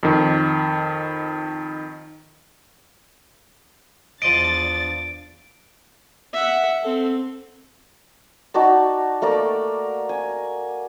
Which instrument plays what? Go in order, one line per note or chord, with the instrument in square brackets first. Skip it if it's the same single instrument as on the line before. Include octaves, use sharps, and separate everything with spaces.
[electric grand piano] F2 D#3
[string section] E2 D4 A6 [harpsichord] F3 D#5 [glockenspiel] D7
[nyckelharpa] E5 F#5
C4 A4
[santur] D#4 F#4 D5 A5
A3 A#3 A#4 D5
G#5